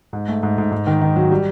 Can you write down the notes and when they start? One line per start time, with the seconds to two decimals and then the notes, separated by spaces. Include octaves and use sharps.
0.13 G#2
0.28 A3
0.43 G#2
0.58 G#2
0.72 G#2
0.87 D#3
1.02 D#3
1.16 F#3
1.31 G3